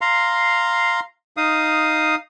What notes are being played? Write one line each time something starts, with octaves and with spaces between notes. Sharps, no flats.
F5 A#5 C6
D#4 F5 D#6